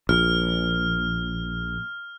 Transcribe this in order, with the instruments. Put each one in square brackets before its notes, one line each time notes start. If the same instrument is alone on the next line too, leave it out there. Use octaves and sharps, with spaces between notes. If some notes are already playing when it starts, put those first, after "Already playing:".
[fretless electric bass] A#1 [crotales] F6